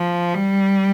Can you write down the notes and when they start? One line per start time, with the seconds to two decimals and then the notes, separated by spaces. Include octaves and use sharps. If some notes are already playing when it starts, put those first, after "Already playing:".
Already playing: F3
0.34 G3